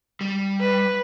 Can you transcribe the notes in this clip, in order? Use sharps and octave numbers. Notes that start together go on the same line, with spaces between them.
G3
B4